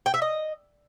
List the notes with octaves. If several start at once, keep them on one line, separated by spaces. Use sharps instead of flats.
G5
E5
D#5